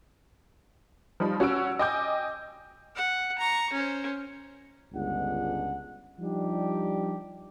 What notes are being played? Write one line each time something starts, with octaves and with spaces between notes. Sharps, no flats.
F3 G3 D#4 B5
C#4 F#4 F#5 E6 D7
D#5 G5 G#5 D6 G6
F#5
A#5 C#6
C#4 C5
G1 C#2 G#3 D4 F#5
F3 G3 D4 D#4 G4